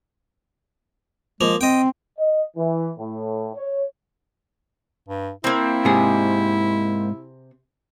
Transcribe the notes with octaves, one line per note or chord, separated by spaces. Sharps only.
F3 G#3 A#3
C4 D#5 G5
D#5
E3
A2
C#5
G2
A#3 C4 E4
G#2 C3 G#4